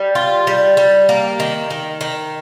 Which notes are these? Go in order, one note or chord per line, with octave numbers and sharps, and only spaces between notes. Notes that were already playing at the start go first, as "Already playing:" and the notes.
Already playing: G3
F4
G3
G3
A#3
D#3
D#3
D#3